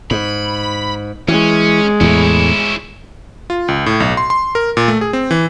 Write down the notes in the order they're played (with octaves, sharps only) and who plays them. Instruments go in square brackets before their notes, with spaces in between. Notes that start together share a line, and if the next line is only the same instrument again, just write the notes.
[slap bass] G#2 [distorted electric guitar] B5
[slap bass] E3 [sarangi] G#3 [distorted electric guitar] C#4
[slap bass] E2 A2 [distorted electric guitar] C#4 E4
[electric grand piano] F4
C#2
A2
B1
C6
C6
A#4
A#2
A3
G#4
C4
E3